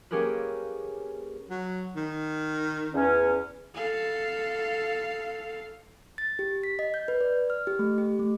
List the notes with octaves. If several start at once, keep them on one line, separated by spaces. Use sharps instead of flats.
A#3 C#4 G4 G#4 A#4 B4
F#3
D#3
E2 C#4
A4 F5
A6
G4
B6
D#5
G6
B4
D5
F6
G4
A3
G4
A3